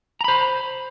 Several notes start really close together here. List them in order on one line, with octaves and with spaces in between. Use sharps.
A#5 B5 C5